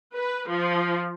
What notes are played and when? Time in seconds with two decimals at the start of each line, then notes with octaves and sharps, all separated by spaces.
0.14 B4
0.49 F3